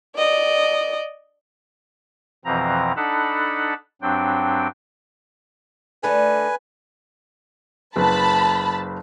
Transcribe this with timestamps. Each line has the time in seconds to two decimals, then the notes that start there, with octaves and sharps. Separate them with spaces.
0.16 D5 D#5
2.45 F2 B2 E3 F3 C4 A#5
2.96 D4 D#4 A4 F#5 A5 B5
4.02 G2 F#3 C4 D4 G5
6.03 D3 A3 D4 B4 G#5
7.96 F#1 B4 A5 B5